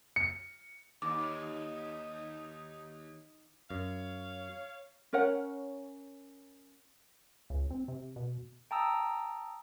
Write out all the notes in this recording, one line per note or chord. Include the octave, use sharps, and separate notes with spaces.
C#7
D#2 D#4 D6
F#2 C#5 F5
C#4 A#4 C#5 F#5
C#2
C4
C3
B2
G5 A5 A#5 D#6 E6